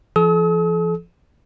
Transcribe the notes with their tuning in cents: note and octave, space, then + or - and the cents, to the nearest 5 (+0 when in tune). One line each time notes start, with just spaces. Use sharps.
F3 -45 A4 -40 D#6 +45